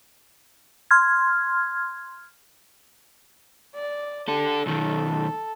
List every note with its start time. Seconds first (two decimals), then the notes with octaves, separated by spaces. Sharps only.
0.91 C6 F6 G#6
3.75 D5
4.28 D4 G4 A4
4.66 B1 D#3 A4